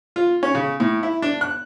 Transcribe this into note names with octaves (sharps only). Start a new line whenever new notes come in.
F4
C#4
C#3
A2
E4
D4
F#6